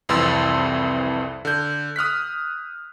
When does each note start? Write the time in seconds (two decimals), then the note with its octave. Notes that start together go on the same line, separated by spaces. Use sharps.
0.09 C2 F2 E3 C6 E6 A6
1.45 D3 G6
1.96 D#6 F6 F#6 B6